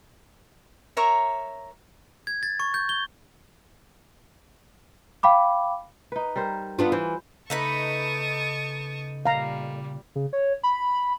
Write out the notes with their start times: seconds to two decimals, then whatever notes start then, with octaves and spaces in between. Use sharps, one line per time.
0.97 A#4 C#5 E5 A#5
2.27 G#6
2.43 A6
2.60 C#6
2.74 G6
2.89 G7
5.23 F5 G5 B5 D6
6.12 D#4 B4
6.36 G3 A#4 C5
6.79 B3 D4 F4
6.92 E3 C5
7.50 C#3 A3 D#4 B4 A5 C#6 D#6
9.26 A#2 G3 F5 A#5
10.16 C#3
10.33 C#5
10.63 B5